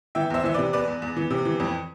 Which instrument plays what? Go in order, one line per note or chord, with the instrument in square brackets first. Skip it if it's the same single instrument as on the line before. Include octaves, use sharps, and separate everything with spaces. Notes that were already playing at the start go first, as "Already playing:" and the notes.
[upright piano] E3 E5 G5
E2 C5 E5
E3 E5
C3 B4 D5
E2 B4 D5
E2
E2
E3
C3
E3
F2